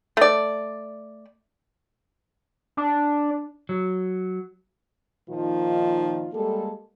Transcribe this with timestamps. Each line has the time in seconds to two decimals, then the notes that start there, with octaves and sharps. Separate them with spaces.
0.17 A3 D5
2.77 D4
3.69 F#3
5.28 A#2 D#3 F3 D#4 F4
6.33 G3 G#3 A#3 G#4 A4